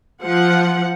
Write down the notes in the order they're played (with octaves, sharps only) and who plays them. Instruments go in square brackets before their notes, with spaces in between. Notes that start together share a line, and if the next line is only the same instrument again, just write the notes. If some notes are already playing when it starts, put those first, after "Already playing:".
[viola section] F3 F#5